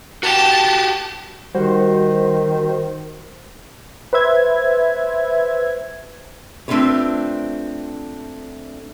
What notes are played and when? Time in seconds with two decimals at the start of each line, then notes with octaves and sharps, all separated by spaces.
0.23 F#4 G4 G5 A5
1.55 D#3 G3 F#4 C5
4.13 B4 C5 E5 G#6
6.68 A3 C4 D4 F4 B4 C#5